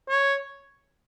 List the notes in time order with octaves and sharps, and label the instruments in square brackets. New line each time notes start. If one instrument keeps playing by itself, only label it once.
[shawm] C#5